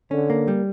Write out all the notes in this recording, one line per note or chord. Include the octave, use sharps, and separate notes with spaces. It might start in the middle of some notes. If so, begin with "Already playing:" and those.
D3 C#4
A#3
G3